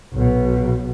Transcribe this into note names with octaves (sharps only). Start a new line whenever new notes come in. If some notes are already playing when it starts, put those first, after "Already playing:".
B1 B2